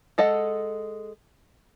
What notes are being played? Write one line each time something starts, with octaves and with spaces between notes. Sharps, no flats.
G#3 A4 D#5 F#5